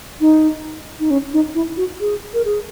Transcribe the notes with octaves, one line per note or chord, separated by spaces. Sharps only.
D#4
D#4
C#4
D#4
E4
F#4
G#4
A#4
G#4